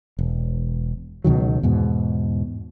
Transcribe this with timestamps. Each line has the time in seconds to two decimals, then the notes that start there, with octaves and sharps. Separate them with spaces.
0.19 E1
1.24 C#2 B2 D#3 F#3
1.63 E2 G#2 B2